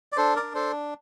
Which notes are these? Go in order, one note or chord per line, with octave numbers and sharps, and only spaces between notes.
D5
D4 A4 C5
A#4 D5
D4
A4 C5